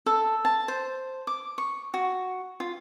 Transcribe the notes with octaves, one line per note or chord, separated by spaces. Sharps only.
A4
A5
C5
D6
C#6
F#4
F4